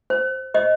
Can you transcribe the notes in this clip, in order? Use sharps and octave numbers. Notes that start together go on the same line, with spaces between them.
C5
C5 D#5